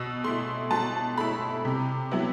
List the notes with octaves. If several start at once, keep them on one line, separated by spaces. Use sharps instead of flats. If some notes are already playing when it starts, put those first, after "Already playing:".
Already playing: B2 E6
A3 E4 C6
B2 A5
A3 E4 B5
C3
F#3 B3 E4